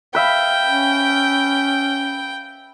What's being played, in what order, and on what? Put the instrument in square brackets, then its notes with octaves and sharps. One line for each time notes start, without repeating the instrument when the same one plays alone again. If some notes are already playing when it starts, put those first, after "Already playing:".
[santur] B4 E5 F5 [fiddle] G5
[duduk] C#4